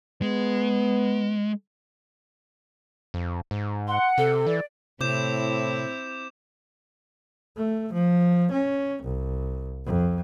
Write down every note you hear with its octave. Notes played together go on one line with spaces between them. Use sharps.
G#3 B3
F2
G#2
F#5 C6
C3 A4
E3 D5
A2 C3 C4 E4 D6 G6 E7
A3
F3
C#4
C2
F2